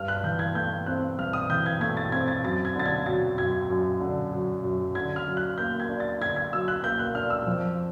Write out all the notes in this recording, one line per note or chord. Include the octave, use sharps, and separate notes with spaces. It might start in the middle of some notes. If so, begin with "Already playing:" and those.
Already playing: G2 F6
F#6
E3 G6
G#6
A3 G6
C4 F#6
G2 F6
D#6
E3 G6
G#6
A3 G#6
A6
C4 G#6
A6
F#2 A6
G#6
D3 A6
G#6
F#3 A6
F#2 G#6
F#2
D3
F#3
F#2
D3 G#6
F6
F#3
F#6
A#3 G6
G#6
D4
A6
D3 G#6
G#6
F#3 E6
F#6
A#3 G6
F#6
D4 F6
E6
F2